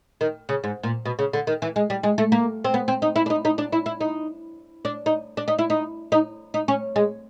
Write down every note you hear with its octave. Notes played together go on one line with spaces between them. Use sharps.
D#3
C#3
G#2
A#2
B2
C#3
D3
D#3
E3
G#3
G3
G#3
A3
A#3
C4
B3
C4
D#4
E4
D4
D#4
D#4
D4
E4
E4
D#4
D4
D#4
D4
D#4
E4
D#4
D#4
D#4
C#4
G#3